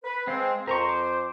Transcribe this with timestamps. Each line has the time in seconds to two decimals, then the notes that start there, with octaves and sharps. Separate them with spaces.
0.04 B4
0.27 G#3 C4 F5
0.67 F2 A#4 C5 A#5 C#6
0.89 D6